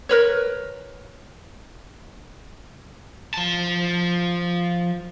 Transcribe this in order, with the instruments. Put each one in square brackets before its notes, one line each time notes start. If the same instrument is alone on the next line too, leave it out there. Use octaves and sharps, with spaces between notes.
[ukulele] A#4 B4 C#5
[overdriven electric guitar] F3 A5